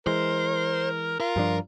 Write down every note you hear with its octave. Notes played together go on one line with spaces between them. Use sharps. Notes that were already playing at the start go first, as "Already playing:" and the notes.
E3 G#3 A#4 C5
F4 A#4
G2 F3 D4